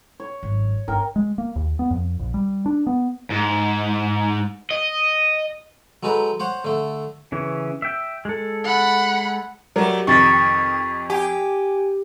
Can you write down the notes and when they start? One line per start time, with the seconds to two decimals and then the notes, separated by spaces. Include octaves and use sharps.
0.20 C#5
0.43 G#1 F#2
0.88 G1 A#4 G5
1.16 G#3
1.38 A#3
1.56 D#2
1.79 B3
1.91 F2
2.19 A#1
2.34 G3
2.66 D4
2.87 B3
3.30 G#2
4.70 D#5
6.03 F#3 G#3 D#4 A4 B4
6.40 C5 C#5 F#5
6.64 D3 A3
7.32 C#3 E3 C#4
7.82 E5 G5
8.25 G#3 A4
8.64 F#5 B5
9.76 F#3 G3 A3 A#4 D5
10.07 F2 C3 D#3 C#6 A6 B6
11.10 G4 G5 G#5